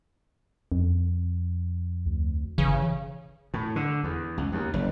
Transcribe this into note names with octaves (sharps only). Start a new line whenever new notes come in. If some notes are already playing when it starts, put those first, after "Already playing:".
F2
D2
G1 C#3 E3
A2
D3
E2
C#2
D#2
F#1